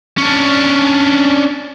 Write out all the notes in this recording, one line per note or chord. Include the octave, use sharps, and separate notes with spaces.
C#4 D4